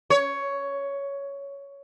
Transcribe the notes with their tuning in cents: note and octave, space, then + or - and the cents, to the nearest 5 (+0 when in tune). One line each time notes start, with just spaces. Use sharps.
C#5 +10